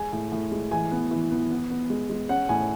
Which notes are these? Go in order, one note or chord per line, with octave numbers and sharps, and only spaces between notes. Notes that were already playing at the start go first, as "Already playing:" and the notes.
Already playing: G#3 G#5
A2
A2
G#3
E3 G#5
B3
E3
B3
B3
B3
G#3
G#3
C#4 F#5
A2 G#5